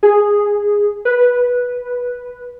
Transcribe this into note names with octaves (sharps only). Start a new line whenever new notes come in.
G#4
B4